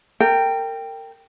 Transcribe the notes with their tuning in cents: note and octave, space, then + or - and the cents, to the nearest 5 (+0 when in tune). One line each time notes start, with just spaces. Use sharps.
A#4 -30 G5 +0